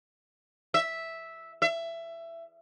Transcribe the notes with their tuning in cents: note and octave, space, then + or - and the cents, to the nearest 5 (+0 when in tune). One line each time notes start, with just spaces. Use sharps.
E5 -5
E5 +20